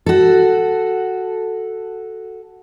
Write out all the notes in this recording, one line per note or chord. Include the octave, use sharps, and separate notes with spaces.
F#4 A4